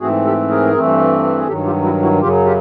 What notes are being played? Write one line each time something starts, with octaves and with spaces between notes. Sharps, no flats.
G#2 E3 A3 C4 F#4 G#4
G4 A4
G#4 A#4
G2 E3 A3 C4
G#4
G2 D#3 F#3 G4 A4
F4 G4
E4 F#4
E4 F#4
F#2 C#3 F#3 F4 G4
F4 G4